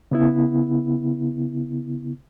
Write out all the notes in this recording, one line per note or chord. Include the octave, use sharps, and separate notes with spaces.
C#3 B3 E4